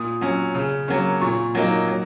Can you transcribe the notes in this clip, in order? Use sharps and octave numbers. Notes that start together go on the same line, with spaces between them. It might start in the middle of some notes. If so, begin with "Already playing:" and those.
Already playing: A#2 D#6
F#3 C#4
C#3
F#3 A#3 C#4
A#2 C#6
F#3 A#3 D#4
F#3